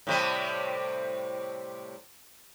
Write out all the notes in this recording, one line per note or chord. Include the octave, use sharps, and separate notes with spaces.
A2 C3 G3